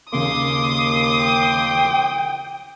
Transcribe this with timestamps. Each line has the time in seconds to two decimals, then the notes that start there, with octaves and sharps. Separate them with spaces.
0.13 D#2 C#3 A#3 C6 D6 D#6
1.22 G5